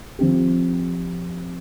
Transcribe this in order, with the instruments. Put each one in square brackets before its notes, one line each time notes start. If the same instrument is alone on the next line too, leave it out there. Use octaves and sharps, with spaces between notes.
[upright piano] F3 C4 G4